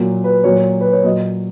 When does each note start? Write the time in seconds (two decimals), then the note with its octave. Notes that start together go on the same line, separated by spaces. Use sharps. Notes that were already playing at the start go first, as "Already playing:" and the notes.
Already playing: A#2 F#3
0.24 B4
0.44 A#2 F#3 C#5
0.80 B4
0.93 C#5
1.04 A#2 F#3 D#5